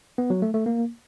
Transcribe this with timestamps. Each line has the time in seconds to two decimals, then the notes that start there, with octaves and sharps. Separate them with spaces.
0.18 B3
0.30 F#3
0.42 A3
0.54 A3
0.66 A#3